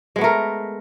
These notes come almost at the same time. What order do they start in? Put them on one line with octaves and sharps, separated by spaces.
G#3 B3 A3 A#4